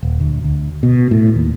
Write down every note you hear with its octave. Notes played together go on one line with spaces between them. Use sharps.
D#1
D2
D2
B2
A2
D#2